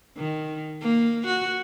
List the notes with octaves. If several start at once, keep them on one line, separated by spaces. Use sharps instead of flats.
D#3
A#3
F#4